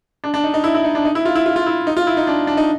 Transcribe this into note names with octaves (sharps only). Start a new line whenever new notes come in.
D4
D4
D#4
D#4
E4
E4
D#4
D4
D#4
E4
F4
E4
F4
F4
E4
D#4
F4
E4
D#4
D4
D4
D#4